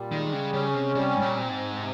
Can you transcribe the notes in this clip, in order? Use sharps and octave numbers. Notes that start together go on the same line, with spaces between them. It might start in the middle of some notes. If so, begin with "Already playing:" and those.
Already playing: A#2 G3
D#3 G#3
C#3
C#3 C#4
C3
C3 G3
G#2
A#2
C4
G#2
C3